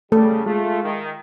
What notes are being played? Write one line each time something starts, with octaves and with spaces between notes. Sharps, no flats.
C#3 G3 A3 A4
G#3 A3 F4
D#3